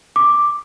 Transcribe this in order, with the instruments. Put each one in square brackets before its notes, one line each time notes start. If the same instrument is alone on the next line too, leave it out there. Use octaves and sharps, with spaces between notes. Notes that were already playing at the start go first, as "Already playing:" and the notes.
[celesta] D6